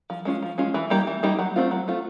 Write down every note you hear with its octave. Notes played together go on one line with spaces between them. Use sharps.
F3
G#3 C#4 F4
F3
G#3 C#4 F4
E3
G3 A#3 D#4 G4
E3
G3 A#3 D#4 G4
F#3
A3 C4 F4
F#3
A3 C4 F4